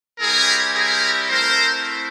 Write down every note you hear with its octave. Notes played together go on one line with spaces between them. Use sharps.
G3 C4 E4 G4 G#4 A#4
G#4 A#4
A3 C4 E4 A#4 C5